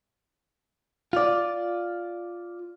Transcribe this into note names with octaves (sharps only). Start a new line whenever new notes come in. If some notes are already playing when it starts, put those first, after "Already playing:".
F4 D5